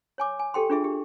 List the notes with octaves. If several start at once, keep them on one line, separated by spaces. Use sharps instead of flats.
C#5 G#5 D6
G#5
G4 A4 G5 C6
D4 F4 G#4 E5
G4